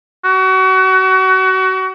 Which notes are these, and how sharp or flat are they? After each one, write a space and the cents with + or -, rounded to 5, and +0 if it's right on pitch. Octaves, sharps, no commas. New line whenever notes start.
F#4 +30